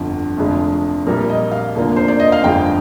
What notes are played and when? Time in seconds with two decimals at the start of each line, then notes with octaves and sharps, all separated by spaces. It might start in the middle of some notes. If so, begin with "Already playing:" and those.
Already playing: G1 F2 D3
0.37 F1 F2 D3 G#3
1.06 A#1 A#2 G3 A#3 A#4
1.29 D#5
1.51 F5
1.75 F1 D#2 D3 F3 A#3
1.96 C5
2.08 D5
2.20 D#5
2.32 F5
2.43 G1 F2 D3 G#3 G5